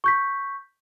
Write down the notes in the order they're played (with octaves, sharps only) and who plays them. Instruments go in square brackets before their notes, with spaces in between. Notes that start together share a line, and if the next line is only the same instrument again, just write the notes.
[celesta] C#6 G6 B6